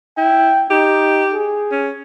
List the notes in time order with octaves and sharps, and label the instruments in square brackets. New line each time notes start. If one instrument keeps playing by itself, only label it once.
[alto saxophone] E4 [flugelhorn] G5
[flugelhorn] D#4 [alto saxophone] G4
[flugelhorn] G#4
[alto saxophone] C#4